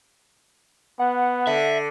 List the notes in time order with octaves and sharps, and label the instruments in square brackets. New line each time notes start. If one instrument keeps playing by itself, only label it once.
[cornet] B3 [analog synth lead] F#5
[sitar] D3 [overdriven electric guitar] E5